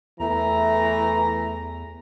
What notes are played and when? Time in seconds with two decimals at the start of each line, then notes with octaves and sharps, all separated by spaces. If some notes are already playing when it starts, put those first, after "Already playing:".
0.20 E2 E3 A3 A#5